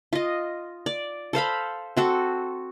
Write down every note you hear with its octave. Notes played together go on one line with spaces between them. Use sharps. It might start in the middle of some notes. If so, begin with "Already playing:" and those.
F4 D#5
D5
A4 C5 F5 B5
C4 F#4 A4